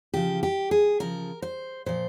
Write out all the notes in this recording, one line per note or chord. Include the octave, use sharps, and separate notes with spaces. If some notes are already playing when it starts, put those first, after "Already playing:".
C#3 F3 G4
G4
G#4
C#3 F3 A#4
C5
A#2 F3 C5